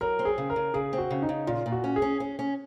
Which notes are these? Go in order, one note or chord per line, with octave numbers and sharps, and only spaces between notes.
F#3 A#4
C4
G#4
C#3
A#4
C#3
C#3 G#4
C4
F#4
C#3
D#4
C#3
A#2 F4
A#2
F#4
C#4
G#4
C#4
C#4
C#4